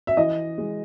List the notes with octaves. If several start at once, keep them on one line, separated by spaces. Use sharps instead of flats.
E5
E3 D#5
G#3